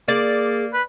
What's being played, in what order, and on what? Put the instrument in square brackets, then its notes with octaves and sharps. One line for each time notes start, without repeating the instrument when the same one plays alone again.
[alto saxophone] A#3 [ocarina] G#4 [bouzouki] D5
[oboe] B4